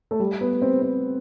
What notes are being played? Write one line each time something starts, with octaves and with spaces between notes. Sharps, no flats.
A3
G3
B3
C4
C4